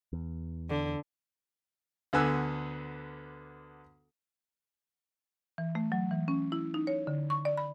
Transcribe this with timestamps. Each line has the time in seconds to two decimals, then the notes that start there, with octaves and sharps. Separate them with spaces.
0.13 E2
0.70 D3
2.13 D2 D3 B3 G#5 E6 F#6
5.58 E3
5.75 A3
5.92 F#3
6.11 E3
6.28 C#4
6.52 E4
6.74 D#4
6.87 C#5
7.07 D3
7.30 C#6
7.45 D5
7.57 B5